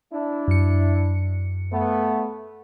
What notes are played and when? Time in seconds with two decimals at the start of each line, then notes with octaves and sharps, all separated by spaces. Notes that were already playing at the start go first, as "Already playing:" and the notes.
0.13 D4 E4
0.48 F#2 C#7
1.72 A3 B3